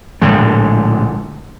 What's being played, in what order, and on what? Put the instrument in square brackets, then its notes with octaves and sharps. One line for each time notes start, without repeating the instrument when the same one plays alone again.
[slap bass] A#1 A2 D3 G#3